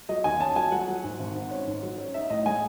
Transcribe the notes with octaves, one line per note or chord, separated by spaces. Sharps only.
F#3 D#5
D#2 G#5
C#4 A5
F#3 G#5
F#3 F#5
F#3
G#2
G#1
G#2
C#4
G#2
F#3
C#4
D#4 E5
A2 D#5
G#3 G#5